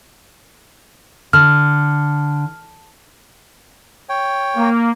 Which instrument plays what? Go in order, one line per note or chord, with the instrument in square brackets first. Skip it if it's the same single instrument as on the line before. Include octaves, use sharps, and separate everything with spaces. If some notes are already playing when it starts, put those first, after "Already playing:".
[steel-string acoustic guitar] D3 [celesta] F6
[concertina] C#5 G5
[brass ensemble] A#3